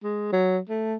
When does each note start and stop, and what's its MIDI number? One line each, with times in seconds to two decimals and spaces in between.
0.04 0.29 56
0.32 0.58 54
0.69 0.95 57